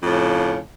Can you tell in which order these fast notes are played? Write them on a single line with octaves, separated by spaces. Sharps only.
F2 A2 C#3